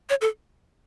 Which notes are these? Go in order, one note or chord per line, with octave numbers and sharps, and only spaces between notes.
C#5
A4